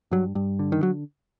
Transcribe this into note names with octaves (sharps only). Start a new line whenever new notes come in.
G2 F#3
G2
D3
D#3
F#3